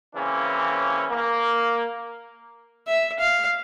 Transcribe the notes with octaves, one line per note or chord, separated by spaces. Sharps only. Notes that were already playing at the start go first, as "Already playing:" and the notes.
C#3 E3 A#3 C4 C#4
A#3
E5
F5